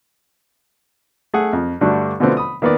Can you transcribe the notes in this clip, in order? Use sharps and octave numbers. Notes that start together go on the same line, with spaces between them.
A3 G#4 F#5
F2
G2 D3 G3 A3 D4 F#4
B2 D3 F3 A3 B3 C4
B5 D#6
D#3 A#3 B3 B4 D5